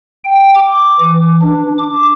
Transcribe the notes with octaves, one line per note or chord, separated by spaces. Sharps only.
G5
D6
E3
D4
D6